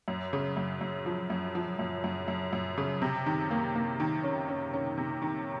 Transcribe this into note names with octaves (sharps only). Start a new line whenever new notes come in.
F#2
C#3
F#2
F#2
F3
F#2
F3
F#2
F#2
F#2
F#2
C#3
C3
D#3
A#3
A#3
D#3
C#4
C#4
C#4
C3
D#3